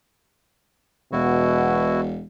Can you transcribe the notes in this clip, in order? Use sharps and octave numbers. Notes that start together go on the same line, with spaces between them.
E1 B2 E4 F#4